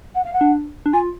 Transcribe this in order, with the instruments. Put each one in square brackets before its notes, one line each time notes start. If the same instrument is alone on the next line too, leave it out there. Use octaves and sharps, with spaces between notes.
[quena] F#5
F5
F#5
[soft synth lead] D4
D4
[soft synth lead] F4 [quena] G#5